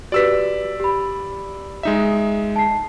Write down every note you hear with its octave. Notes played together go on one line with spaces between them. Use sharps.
F#4 G4 B4 D5 E6 B6
G4 B5
G#3 D#4 E5
A5 C7